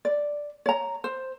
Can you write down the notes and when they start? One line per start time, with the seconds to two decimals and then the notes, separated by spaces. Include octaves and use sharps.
0.05 D5
0.66 C#5 A#5
1.04 C5